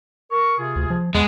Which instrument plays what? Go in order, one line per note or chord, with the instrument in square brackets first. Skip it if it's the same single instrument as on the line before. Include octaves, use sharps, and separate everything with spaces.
[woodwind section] A#4 C#6
C3 F4 G#4
[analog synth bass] D2
F3
[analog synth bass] E2 [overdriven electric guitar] G#3 [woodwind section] B3